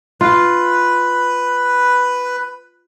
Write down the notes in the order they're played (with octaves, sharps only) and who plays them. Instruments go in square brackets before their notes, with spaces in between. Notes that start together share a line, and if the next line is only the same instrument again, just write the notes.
[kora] F4 [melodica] B4